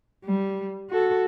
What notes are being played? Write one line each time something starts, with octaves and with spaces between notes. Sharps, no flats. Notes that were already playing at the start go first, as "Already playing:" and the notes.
G3
F#4 A4